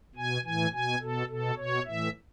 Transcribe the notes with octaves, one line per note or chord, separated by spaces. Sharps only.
B2 G#5
A2 E3 G#5
B2 G#5
B2 A4
B2 A4
B2 C#5
A2 E3 E5